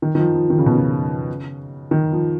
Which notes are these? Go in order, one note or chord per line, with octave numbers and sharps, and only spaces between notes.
D#3
D#3
F3
F3
D#3
C#3
B2
C#3
D#3
F3